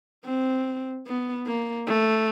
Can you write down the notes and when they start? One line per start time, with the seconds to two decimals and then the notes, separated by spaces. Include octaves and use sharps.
0.25 C4
1.07 B3
1.47 A#3
1.87 A3